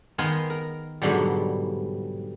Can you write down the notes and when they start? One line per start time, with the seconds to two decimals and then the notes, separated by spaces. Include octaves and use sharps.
0.18 D#3 B3 A#4 F5 G#5 C6
0.50 A#4
1.02 G#2 B2 D3 F#3 G3